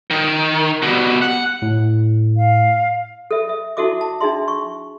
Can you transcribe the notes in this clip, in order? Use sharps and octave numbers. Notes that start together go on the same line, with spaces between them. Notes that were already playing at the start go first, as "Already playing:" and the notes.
D#3
B2 G3
F#5
A2
F5
A4 E5
E5
D#4 E4 F#4 A4 E5 D6
A5
D4 D#4 G#4 E5 C6
C#6